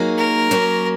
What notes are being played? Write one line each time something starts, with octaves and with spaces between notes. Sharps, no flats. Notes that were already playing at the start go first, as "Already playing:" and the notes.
Already playing: F#3 A#3 D#4 G#4
A#4
F#3 A#3 C#4